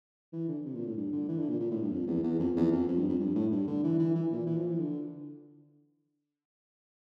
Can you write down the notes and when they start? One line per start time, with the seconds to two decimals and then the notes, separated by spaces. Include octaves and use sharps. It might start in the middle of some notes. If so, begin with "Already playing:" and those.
0.33 E3
0.48 D3
0.65 C3
0.75 A#2
0.86 A2
0.97 G2
1.12 D3
1.28 E3
1.39 D3
1.49 A#2
1.60 A#2
1.71 A2
1.82 G2
1.92 F2
2.08 E2
2.23 E2
2.40 F2
2.56 E2
2.72 F2
2.88 F2
2.98 G2
3.09 F2
3.20 G2
3.35 A2
3.51 G2
3.68 D3
3.84 E3
3.99 E3
4.15 E3
4.32 A#2
4.47 E3
4.57 F3
4.68 E3
4.79 D3